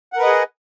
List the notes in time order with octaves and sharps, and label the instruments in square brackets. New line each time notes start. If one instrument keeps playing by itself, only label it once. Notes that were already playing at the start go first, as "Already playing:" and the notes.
[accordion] F#5
A#4
B4
D#5
G#4